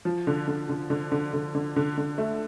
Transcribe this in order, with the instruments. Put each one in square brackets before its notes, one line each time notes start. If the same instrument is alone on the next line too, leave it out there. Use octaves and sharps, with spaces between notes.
[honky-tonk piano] F3
D3
D3
D3
D3
D3
D3
D3
D3
D3
A3